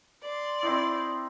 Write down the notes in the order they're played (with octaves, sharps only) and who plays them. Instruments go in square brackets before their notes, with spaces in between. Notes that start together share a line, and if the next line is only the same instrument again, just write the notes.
[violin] D5 C6
[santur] C4 D#4 E4